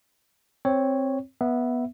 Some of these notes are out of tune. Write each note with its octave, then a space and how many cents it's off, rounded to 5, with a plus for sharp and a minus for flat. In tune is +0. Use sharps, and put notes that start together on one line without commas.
C4 +10 C#5 +0
B3 -10 E5 +0